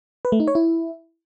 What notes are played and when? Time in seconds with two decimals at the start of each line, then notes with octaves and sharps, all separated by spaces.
0.25 B4
0.32 A3
0.40 D#4
0.48 C#5
0.55 E4